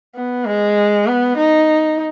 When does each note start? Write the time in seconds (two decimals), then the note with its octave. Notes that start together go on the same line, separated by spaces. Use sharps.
0.15 B3
0.46 G#3
1.07 B3
1.37 D#4